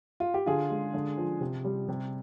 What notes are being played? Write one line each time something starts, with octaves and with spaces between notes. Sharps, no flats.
F4
G4
D3 F4 G#4
G#3
D3
F3
C3
G3
C3